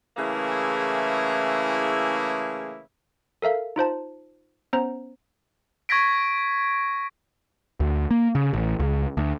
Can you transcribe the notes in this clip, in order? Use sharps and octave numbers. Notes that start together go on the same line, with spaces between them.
C#3 E3 A3 A#3 E4 G#4
A4 A#4 E5 F5
D#4 F4 C5 A5
B3 C#4 C5 A#5
C#6 G#6 A#6 B6 D7
D2
A#3
C#3
A1
C#2
D2